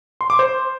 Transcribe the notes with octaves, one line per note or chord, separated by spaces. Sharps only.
C6
D6
C5